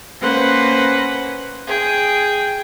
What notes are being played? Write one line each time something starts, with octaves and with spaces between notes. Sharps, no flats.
A#3 C#4 B4 C5 F#5
G#4 G5